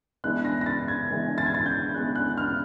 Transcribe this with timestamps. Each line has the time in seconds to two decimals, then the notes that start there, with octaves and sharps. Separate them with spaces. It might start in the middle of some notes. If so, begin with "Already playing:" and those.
0.24 E3 G#3 B3 D4 F#6
0.45 A#6
0.61 A#6
0.66 A6
0.88 G#6
1.09 E3 G#3 B3 D4
1.38 A6
1.46 G#6
1.54 A6
1.66 G6
1.94 E3 G#3 B3 D4 F#6
2.15 F#6
2.37 F6